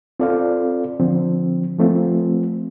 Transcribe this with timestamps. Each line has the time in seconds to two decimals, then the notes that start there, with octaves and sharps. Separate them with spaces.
0.20 C4 F4 A4 D5 F5
1.00 D3 F3 C4
1.78 F3 A3 C4 F4